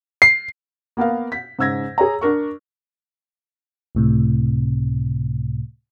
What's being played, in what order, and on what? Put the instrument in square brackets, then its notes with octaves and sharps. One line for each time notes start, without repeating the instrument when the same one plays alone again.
[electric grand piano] C7
[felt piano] A#3 B3 A#4 F5
B6
G#2 C#3 E6 G#6 A#6
G#4 C#5 A#5
D4 A#4 C#6
[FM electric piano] C#2 A2 C3